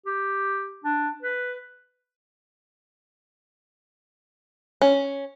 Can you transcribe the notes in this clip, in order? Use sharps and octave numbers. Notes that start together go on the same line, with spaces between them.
G4
D4
B4
C#4